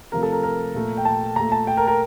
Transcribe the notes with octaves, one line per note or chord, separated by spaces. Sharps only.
C3 F3 A3 A#4
A4
A#4
A#4
A#2 A3
G5
A5
A#2 A3 A#5
A5
G5
A#4
A#4